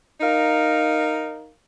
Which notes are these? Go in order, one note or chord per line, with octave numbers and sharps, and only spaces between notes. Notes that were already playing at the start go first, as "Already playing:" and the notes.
D#4 A#4 F5